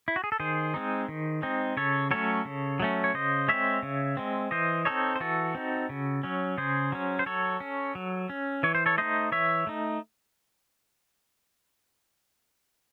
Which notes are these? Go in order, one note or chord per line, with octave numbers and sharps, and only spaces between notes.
E4
F#4
G#4
A4
D#3 G#4 C5
G#3 C4 D#4
D#3
G#3 C4 D#4
C#3 A4 C#5
F#3 A3 C#4 A4 C#5
C#3
F#3 A3 C#4
C#5
C#3 C5 D#5
G#3 C4 C#5 E5
C#3
G#3 C4
E3 C5 D#5
C4 D#4 A4 C#5
C5
E3 F#4 A4
C4 D#4
C#3
F#3 C#4
C#3 G#4 C5
F#3 C#4
C5
F#3 A4 C#5
C#4
F#3
C#4
E3 C#5
C5
A4 C#5
A3 D#4 C5 D#5
E3 C#5 E5
A3 D#4